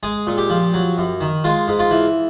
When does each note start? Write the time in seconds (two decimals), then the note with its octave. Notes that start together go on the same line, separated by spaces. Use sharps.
0.03 G#3 G#4
0.27 A#2
0.38 G4
0.50 F3
0.74 F#3
0.98 F#2
1.21 D#3
1.44 G#3 F4
1.68 G#2
1.80 F4
1.91 E3